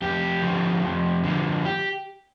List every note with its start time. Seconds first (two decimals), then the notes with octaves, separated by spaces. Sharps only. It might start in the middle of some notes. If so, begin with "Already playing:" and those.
0.02 F2 G4
0.42 D3 F3
0.83 F2
1.23 D3 F3
1.65 G4